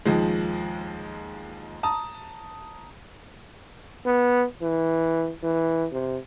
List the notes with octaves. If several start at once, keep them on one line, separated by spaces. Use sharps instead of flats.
D#2 F3 G#3
A5 A#5 D#6
B3
E3
E3
C3